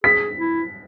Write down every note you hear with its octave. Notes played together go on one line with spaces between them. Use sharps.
G#4 B6
E4